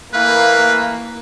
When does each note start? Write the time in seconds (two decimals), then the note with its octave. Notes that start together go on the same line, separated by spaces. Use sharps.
0.14 E3 A3 A#3 B4 F5